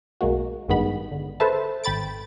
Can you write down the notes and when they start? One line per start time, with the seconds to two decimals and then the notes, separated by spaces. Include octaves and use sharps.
0.21 B1 G#3 A#3 F#4
0.68 A1 G2 D#3 G#3 B3 B5
1.12 D3
1.40 A4 B4 C5 E5 A5
1.84 G#1 G5 B5 A6 D7